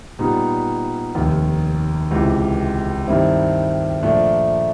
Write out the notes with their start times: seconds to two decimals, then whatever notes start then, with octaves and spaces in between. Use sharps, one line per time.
0.19 A#2 G3 B3 D#4
1.15 F1 D#2 D#3
2.11 C#2 C3 E3
3.07 G2 D#3 G3 C4 E4
4.02 A#2 F3 A3 D4